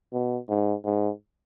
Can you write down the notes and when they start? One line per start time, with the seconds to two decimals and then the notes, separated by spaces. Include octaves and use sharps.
0.13 B2
0.49 G#2
0.84 G#2